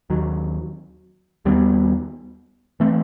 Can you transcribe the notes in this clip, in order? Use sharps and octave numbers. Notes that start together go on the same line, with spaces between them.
D#2 D#3 F#3
D#2 D#3 G3 B3
E3 A3 C4